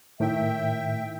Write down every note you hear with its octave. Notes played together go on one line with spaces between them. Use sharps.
A2 D#3 E5 G5